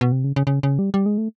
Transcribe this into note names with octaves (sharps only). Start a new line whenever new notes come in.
B2
C3
C#3
C#3
C#3
C#3
G3
G3
G#3
A3